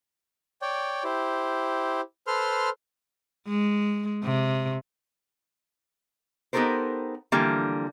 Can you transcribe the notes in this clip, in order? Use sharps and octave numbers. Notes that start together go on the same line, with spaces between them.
C#5 D5 G5
E4 G4 C5
A4 B4 C5 C6 F6
G#3
C3
B3 D#4 G4 A4 A#4 C5
D3 E3 F3 G3 A#3